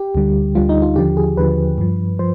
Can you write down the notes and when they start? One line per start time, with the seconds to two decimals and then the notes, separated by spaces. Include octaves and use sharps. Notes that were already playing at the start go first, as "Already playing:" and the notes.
Already playing: G4
0.15 D2 D3 G3
0.55 D2 D3 G3 F4
0.69 D#4
0.82 F4
0.96 D#2 D3 F3 G4
1.17 G#4
1.37 D#2 D3 F3 B4
1.78 G2 F3
2.19 F3 C5